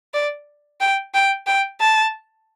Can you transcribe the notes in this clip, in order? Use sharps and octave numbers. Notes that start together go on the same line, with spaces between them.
D5
G5
G5
G5
A5